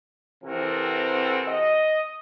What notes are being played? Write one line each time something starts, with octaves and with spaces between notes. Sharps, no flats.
C3 E3 C4 F#4 A4 A#4
D#5